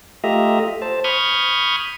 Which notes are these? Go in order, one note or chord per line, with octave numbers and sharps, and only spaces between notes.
A3 F4 G4 D#5 E5 A#5
C5 A5
B5 C#6 D#6 F6 G6 G#6